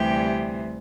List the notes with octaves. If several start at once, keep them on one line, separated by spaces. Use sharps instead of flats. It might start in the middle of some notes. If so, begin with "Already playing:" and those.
Already playing: D2 C3 E3 G3 G4